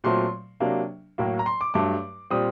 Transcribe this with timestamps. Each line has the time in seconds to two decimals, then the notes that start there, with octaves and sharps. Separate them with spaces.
0.04 A#2 F#3 A3 C4 C6
0.60 C3 F#3 A#3 D4
1.18 A2 F#3 A#3
1.39 A#5
1.46 C6
1.61 D6
1.74 G2 F#3 A3 D6
2.30 A#2 G3 C4 D#6